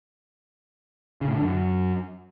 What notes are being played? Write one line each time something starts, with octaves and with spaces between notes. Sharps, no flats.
C#3
A2
D3
F#2